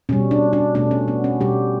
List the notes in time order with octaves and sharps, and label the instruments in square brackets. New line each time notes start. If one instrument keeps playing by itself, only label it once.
[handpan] B2 G3 C#4
D4
D4
B2 A3 D4
C#4
B3
C#4
B2 G3 G4